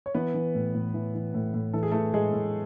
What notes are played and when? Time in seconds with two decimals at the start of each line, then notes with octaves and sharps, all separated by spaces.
0.06 C#5
0.14 E3 B3 B4
0.34 E3
0.55 A2
0.75 A2
0.94 E3
1.15 E3
1.34 A2
1.54 A2
1.73 E3 A4
1.83 G#4
1.92 E3 A3 A4
2.14 A2 G#3 G#4
2.33 A2